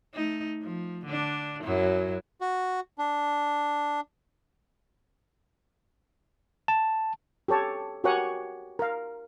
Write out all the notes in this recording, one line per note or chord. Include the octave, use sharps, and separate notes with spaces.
A3 D#4
F3
D3 D4
F#2 F#3 E4
F#4
D4
A5
G4 A4 C#5 A5
F#4 G4 A#4 C#5 F#5 G#5
A#4 F5